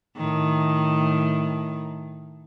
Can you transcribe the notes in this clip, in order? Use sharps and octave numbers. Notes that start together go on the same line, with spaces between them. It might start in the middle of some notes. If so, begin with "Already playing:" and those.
A2 D#3